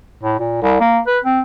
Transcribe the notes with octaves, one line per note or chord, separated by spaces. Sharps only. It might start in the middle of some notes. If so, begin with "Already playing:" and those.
A2
A#2
C2
A#3
B4
C4